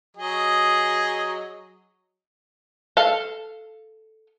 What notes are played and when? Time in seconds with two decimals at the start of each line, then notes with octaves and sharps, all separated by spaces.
0.17 F#3 G#4 D#5
2.97 A4 F5